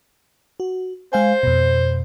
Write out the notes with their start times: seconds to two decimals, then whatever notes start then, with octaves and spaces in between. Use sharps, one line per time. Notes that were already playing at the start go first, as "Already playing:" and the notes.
0.60 F#4
1.13 G#3 C5 F5 G#5
1.43 F2 B2